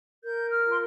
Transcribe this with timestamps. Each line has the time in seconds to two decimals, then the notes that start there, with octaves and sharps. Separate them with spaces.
0.24 A#4 G6
0.50 F6
0.63 F4
0.72 C6